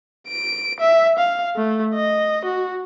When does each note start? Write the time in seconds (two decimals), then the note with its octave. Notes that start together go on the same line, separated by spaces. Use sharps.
0.28 D7
0.80 E5
1.19 F5
1.56 A3
1.95 D#5
2.45 F#4